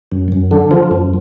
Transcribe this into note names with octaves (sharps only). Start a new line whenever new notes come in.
F#2
F#2
D3
F3
F#2